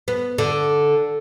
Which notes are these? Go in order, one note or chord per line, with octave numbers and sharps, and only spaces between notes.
B3
D3